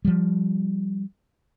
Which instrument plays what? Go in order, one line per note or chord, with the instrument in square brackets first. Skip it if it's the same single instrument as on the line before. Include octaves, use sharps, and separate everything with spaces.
[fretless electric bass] F3 G3